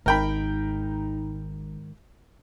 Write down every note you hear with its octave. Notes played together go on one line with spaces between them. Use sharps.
G#1 G#2 D#3 D#4 A#4 G5 B5